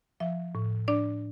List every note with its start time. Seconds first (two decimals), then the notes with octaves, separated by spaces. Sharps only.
0.20 F3 E5
0.55 A2
0.88 D4 D5